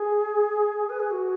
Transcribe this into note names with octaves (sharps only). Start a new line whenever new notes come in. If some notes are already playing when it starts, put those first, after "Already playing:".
Already playing: G#4
B4
G#4
F#4